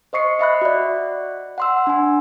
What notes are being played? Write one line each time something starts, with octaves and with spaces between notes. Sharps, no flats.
C5 D#5 C#6 C7 C#7
D#5 E5 B5 F#6
F#4 D5
F#5 C6 E6
D4 G#5